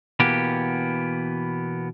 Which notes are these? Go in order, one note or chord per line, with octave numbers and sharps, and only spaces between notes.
B2 E3 A#3 B3 G4